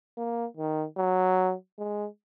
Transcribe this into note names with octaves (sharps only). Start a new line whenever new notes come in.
A#3
D#3
F#3
G#3